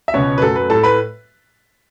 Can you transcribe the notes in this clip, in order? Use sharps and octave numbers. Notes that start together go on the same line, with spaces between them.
E5
C#2 B2 B3 C#4 C#5
B4
F#2 F#3 A3 A4
B4
A2 A3 A4 A5
B4 B5